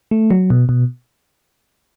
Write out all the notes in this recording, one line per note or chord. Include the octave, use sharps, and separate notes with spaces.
A3
F#3
B2
B2